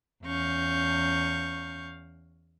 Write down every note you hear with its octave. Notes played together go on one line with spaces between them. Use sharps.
E2 C#4 F5 C#6 G6